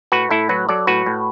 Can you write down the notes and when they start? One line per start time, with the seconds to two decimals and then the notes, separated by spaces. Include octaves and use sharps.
0.12 A2 F#4 B4
0.31 A2 E4 A4
0.49 F#3 F#4 B4
0.69 F#3 A4 D5
0.87 A2 F#4 B4
1.06 A2